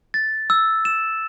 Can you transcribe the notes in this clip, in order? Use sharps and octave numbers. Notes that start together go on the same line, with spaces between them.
A6
E6
E7